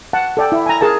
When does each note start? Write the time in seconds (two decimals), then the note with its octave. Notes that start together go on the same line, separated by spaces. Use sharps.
0.13 F#5 A5
0.37 A4 D5 G5
0.52 E4
0.66 G#5 A#5
0.81 G#4 A#4 A5